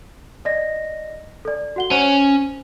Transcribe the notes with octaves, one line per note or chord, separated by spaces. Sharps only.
D5 D#5 A#6
A4 D5
F#4 F#5 G7
C#4 C5